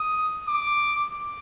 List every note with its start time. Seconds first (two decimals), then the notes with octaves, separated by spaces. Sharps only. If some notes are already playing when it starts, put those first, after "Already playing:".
Already playing: D#6
0.48 D6